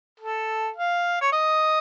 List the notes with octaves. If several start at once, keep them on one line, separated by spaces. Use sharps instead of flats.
A4
F5
C#5
D#5